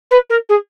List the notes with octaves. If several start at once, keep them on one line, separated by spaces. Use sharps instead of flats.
B4
A#4
G#4